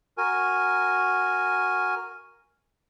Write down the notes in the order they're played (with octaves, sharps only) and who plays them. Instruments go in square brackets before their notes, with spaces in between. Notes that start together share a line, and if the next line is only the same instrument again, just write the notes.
[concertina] F#4 A#4 G#5